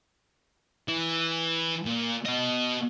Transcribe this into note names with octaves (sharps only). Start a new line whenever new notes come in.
E3
A#2
B2 D#5